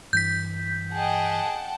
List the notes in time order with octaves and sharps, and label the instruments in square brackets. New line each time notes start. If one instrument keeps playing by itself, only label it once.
[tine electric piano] G2 E3 [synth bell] G6 B6
[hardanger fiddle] G#4 D#5 [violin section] F#5 G5 A5